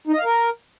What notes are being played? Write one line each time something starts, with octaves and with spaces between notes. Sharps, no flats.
D#4
D#5
F5
A#4